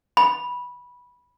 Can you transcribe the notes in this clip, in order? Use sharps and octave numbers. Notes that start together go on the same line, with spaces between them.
B5